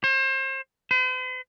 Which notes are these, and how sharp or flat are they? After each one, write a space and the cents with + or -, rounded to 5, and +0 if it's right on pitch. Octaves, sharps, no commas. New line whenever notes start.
C5 +35
C5 -45